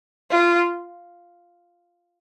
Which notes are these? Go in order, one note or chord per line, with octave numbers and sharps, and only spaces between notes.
F4